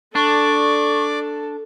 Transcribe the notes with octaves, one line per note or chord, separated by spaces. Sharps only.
D4 A4 D5 C#6 D6